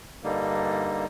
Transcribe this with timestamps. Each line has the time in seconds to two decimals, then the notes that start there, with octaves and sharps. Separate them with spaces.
0.23 G2 D3 G3 A#3 D#4